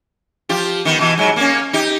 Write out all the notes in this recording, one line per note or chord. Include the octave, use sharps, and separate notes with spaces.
F3 F4 G4
D#3 B3
B2 E3
G#2 F#3
A#3 C#4
D#4 G4